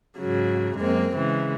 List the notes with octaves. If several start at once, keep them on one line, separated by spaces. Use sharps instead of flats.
G#2 C#3 F#3
F#2 G#3 A#3 C4
C#3 E3 G#3